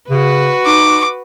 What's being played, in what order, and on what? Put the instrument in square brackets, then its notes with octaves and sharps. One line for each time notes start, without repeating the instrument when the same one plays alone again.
[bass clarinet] C#3 [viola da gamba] F#4 B4
[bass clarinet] D#4 [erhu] D6